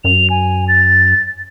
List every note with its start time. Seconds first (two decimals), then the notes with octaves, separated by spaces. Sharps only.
0.04 F#2 F7
0.30 G#5
0.68 A6